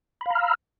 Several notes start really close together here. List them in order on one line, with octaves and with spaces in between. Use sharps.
B5 F5 A#5 F6 E6